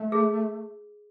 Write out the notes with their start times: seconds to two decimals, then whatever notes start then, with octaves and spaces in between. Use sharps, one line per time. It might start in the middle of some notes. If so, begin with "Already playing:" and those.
Already playing: A3
0.12 G#4